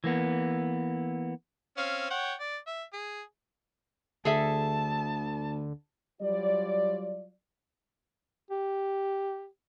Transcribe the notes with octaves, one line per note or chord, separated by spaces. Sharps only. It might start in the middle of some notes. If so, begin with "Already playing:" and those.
E3 A#3 B3
C4 C#4 F5
C#5 F#5 G5
D5
E5
G#4
D2 D3 G#4 A4 E5 A5
F#3 G3 F4 D5
G4